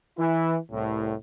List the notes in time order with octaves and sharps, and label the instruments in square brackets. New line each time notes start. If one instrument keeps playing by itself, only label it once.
[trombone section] E3 E4
C2 A2